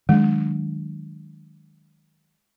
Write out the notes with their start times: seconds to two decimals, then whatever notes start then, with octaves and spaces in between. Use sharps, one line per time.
0.09 D#3 F#3 G#3 D4